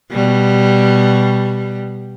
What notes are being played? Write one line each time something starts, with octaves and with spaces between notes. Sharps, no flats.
B2 G3